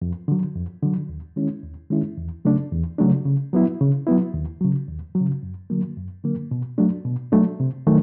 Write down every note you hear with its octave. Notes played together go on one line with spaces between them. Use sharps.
F2
D3 F#3
F2
D3 F#3
D#2
D#3 G#3 C#4 E4
D#2
D#3 G#3 C#4 E4
E2
C#3 F#3 A3 D4
E2
C#3 F#3 A3 D4
C#3
F#3 B3 E4
C#3
F#3 B3 E4
D#2
C#3 F#3
D#2
F#3
C#3
F#2
D3 F#3 A#3
F#2
D3 F#3 A#3
B2
F#3 A3 D4
B2
F#3 A3 D4
C3
D#3 F#3 A3